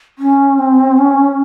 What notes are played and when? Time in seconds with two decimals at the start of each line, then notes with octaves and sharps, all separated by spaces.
0.18 C#4
0.58 C4
0.98 C#4